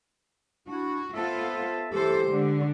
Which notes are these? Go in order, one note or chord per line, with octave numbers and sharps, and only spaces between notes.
D4 E4 F#4
B3 F4 A4 C5 E5 A5
E3 G4 A4 C5
D3 G#3